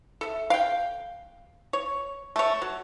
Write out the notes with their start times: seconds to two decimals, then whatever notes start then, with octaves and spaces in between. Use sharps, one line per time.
0.21 A4 E5
0.50 F5 G5
1.73 C#5
2.36 A3 C#5
2.62 F#3